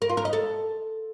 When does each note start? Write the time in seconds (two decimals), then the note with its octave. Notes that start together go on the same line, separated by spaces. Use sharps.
0.02 A#4
0.09 F4
0.17 A#4
0.25 D#5
0.33 A4